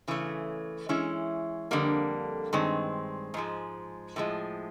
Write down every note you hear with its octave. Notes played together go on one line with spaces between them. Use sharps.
C#3 E3 A3 C#4
E3 G#3 C#4 E4
F2 D3 G3 A#3
G2 D#3 G#3 C4
G#2 F3 G#3
A2 F3 G#3